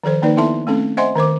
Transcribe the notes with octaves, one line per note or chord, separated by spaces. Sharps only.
D#3 F3 A4 C5
D#3 A#3 D#4 B4 D5
B3 E4 A4 E5 A5 C6
A3 C4 C#4 A4
C5 D#5 E5 F#5 G#5 C6
D#3 A#4 C5 D6